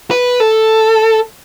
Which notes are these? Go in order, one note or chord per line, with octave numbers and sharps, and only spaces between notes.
B4
A4